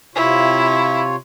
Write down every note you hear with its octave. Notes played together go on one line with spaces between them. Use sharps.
C3 E4 F4 C#5